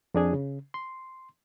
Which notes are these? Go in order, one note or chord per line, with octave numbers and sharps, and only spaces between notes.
F2 D4 G#4
C#3
C6